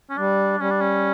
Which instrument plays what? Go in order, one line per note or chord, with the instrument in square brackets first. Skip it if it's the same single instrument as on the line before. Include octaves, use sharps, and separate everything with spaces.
[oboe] C#4
[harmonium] G3 [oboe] D4
[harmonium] G3 [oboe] C#4
[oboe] D4
C#4